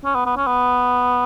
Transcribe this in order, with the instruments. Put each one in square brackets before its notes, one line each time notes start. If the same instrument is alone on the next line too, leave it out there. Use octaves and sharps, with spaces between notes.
[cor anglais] C#4
B3
B3
C#4
B3